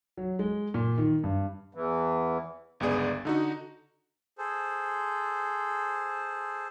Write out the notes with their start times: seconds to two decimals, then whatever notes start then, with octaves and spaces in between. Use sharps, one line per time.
0.17 F#3
0.39 G#3
0.74 A#2
0.98 D#3
1.24 G2
1.75 E2 E3
2.80 G1 C#2 B3 G#4 D5
3.25 D3 D#4 F#4
4.38 G#4 A4 C5